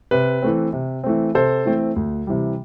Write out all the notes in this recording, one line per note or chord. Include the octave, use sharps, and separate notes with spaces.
C3 B4
E3 A3 C4
C3
E3 A3 C4
C3 A4 C5
E3 A3 C4
D2
C3 E3 G3